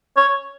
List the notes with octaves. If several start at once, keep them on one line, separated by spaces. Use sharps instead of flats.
C#5